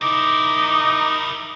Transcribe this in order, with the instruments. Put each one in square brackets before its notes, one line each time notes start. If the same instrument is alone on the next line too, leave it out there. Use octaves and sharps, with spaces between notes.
[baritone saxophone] D#4 [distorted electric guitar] E4 A#4 [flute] D6